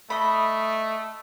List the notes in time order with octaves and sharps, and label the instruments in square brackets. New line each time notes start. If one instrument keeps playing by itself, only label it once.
[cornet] A3 [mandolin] D#5 B5